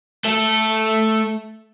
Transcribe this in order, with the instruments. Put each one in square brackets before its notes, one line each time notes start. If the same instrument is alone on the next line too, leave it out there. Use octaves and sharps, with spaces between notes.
[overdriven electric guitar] A3 A4